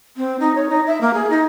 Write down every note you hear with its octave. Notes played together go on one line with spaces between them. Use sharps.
C4
D#4
C#5
D#4
E5
A#3
G#4
D#4